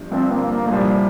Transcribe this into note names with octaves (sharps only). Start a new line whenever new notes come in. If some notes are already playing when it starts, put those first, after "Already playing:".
Already playing: G1 G2 F3
G1 G2 F3 C4
A#3
A#3
C2 A#2 F3 G3 A#3 F4